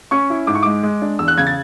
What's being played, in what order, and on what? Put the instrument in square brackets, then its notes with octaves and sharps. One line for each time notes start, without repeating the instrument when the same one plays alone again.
[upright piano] C#4 C#6
E4
G#2 D6
C#6
G#3 D6
G#3
D4
E2 E6
F#6
C#3 G#6
A6